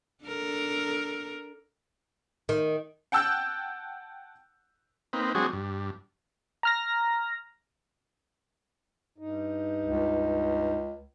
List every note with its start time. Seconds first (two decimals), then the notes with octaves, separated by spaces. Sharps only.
0.24 D4 A4 A#4
2.49 D#3
3.12 F#5 G5 A5 E6 F#6 G6
5.13 A#3 C4 D#4 B4
5.35 F#3 G#3 C4 D4 F#4 G#4
5.53 G2
6.63 A#5 F6 A#6
9.18 G2 D#4
9.83 C#2